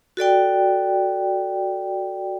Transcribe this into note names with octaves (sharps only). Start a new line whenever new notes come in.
F#4 A4 D5 G5